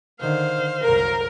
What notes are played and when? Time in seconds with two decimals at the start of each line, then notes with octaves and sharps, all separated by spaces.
0.20 D3 D#3 C5 F5
0.82 C2 F#2 A#4